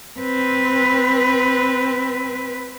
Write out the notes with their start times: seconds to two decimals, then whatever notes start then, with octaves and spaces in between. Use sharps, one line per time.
0.20 C4 B4